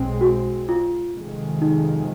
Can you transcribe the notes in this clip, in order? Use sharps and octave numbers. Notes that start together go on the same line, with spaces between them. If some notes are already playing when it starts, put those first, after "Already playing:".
Already playing: B1 B2 G#3 C4
F#4
F4
F2 C3 D#3 G#3
D#4